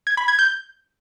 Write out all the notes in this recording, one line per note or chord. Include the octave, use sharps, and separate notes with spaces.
G#6
B5
G#6
G6